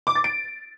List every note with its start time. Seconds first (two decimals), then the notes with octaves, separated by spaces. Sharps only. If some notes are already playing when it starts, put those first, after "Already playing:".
0.07 D6
0.15 A6
0.24 D7